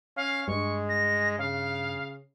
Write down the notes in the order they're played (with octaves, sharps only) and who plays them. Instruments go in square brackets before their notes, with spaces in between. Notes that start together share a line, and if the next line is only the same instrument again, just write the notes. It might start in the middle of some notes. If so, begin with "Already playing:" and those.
[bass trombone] C#4 [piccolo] F5
[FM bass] G2 [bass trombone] G#3 [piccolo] C#6
[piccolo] A#6
[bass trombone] C#3 [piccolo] F5